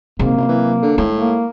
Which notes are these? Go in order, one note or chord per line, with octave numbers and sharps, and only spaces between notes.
G#2 C3 F#3 A#3
F#1
E3
D3
A2 G#3 D#4
A#3